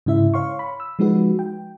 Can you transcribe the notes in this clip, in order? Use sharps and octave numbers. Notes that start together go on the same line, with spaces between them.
G#2 C#3 E4 E5
C#5 F5 C6 C#6
B5
E6
F3 G#3 D#4 F#4 B4
G5